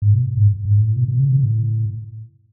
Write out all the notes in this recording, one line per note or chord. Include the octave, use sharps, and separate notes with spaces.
G#2
B2
G#2
G#2
A2
B2
B2
C#3
C#3
A2